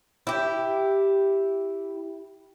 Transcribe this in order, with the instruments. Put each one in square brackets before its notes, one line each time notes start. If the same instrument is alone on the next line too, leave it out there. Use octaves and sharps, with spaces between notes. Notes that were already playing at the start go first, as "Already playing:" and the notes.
[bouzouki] E4 G4